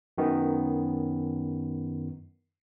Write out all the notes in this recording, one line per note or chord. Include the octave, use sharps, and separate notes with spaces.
F#2 D#3 B3